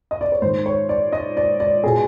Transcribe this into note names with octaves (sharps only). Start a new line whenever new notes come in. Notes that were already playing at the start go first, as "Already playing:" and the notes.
D#5
D5
C#5
G#2 D#3 C5
C#5
D5
D#5
D5
D5
B2 G#4